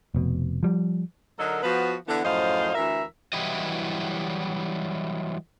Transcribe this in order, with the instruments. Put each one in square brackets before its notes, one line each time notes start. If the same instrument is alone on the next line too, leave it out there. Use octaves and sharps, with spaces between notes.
[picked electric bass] F1 B2
F3 G3
[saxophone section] D3 F#3 D#4 A4 A#4
F3 B3 F#4
D3 E3 B3
F#2 A2 F3 C5 D#5 F5
D2 E3 A#4 E5
[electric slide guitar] E3 F#3 G3 E4 G4 D#5